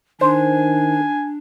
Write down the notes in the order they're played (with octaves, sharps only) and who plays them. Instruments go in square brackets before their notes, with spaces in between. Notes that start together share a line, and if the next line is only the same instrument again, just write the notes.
[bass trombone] D#3 [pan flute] D4 [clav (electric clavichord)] C5 [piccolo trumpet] G#5